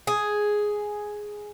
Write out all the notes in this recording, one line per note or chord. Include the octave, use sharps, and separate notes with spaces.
G#4